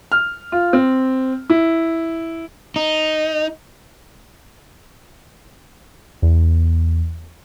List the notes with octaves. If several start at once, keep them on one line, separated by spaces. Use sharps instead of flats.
F6
F4
C4
E4
D#4
E2